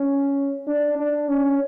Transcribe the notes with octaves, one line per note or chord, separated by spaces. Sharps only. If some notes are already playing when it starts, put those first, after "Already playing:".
Already playing: C#4
D4
D4
C#4